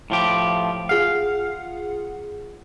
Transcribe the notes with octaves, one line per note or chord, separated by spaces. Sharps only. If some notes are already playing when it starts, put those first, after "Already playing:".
A2 F3 G4
F4 G#4 F5 F#5